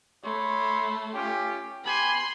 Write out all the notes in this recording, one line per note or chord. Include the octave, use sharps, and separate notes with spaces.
A3 C#5 B5 C6
C#4 F4 G4
B3 G4 G#5 B5 C6